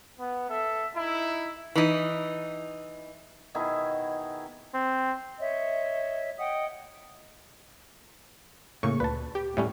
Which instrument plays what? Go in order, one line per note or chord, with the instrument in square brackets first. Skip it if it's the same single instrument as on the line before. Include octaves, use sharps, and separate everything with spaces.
[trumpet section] B3
A4 E5
D#4 E4
[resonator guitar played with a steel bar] E3 D#4
[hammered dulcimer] B2 D#3 E4 G#4
[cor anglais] C4
[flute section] C#5 D#5 E5
D#5 F#5 G5 D#6
[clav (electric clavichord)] A2 [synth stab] C#3 A#3 C#6
[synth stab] D2 A#2 [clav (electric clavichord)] B4 A5
[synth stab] G4
[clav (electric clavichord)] A2 G3 C#4 [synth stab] A3